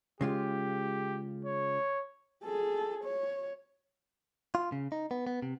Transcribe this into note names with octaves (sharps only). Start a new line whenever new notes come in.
C#3 G#3 F4 G4
C#5
G#4 A4
C#5
F4
C#3
D#4
B3
B3
C3